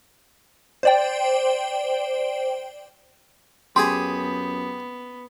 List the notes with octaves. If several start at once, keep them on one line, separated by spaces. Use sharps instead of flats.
C5 D5 G5
F#2 B3 G4 G#4 G#5 C6